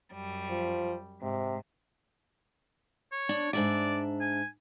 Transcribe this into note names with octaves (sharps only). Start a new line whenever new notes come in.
F#2 G3
F3
G#2 C3
C#5
D4
G#2 D4 D5 E5
G#5